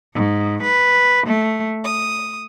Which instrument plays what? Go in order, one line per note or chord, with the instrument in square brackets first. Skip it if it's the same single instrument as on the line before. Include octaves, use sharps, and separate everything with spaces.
[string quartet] G#2
B4
A3
D#6